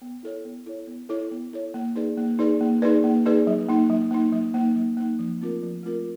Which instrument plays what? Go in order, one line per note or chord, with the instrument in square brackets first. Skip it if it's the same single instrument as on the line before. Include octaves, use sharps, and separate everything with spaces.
[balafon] B3
E4 A4 C#5
B3
E4 A4 C#5
B3
E4 A4 C#5
B3
E4 A4 C#5
A#3
D#4 G#4 B4 D5
A#3
D#4 G#4 B4 D5
A#3
D#4 G#4 B4 D5
A#3
D#4 G#4 B4 D5
F#3
A#3 D#4
F#3
A#3 D#4
F#3
A#3 D#4
F#3
A#3 D#4
F3
A3 C4 F4 A#4
F3
A3 C4 F4 A#4